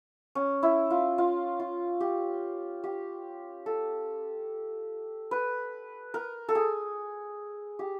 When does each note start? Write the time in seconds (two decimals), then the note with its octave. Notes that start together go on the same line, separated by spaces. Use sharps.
0.35 C#4
0.63 E4
0.90 F4
1.18 F4
1.59 F4
2.00 G4
2.84 G4
3.66 A4
5.31 B4
6.14 A#4
6.49 A4
6.55 G#4
7.79 G4